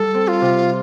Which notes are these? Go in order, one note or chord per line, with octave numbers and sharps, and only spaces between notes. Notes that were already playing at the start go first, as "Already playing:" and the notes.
Already playing: G3 A4
C4
F4
C3